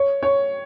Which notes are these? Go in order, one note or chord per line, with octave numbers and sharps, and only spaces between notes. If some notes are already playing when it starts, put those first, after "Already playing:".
Already playing: C#5
C#5